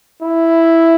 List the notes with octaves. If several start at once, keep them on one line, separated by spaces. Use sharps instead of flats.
E4